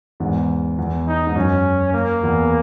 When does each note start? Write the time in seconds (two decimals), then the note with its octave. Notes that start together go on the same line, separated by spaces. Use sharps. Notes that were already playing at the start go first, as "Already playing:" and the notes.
0.20 E2 G#2
0.78 E2
1.07 D#4
1.27 G#2
1.36 F#2 C#4
1.93 A#3
2.23 E2